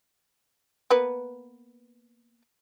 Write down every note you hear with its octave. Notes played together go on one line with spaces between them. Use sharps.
A#3 B3 B4